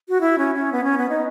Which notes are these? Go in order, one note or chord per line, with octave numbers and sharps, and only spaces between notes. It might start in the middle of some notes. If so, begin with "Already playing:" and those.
F#4
E4
C#4
C#4
B3
C#4
B3
D#4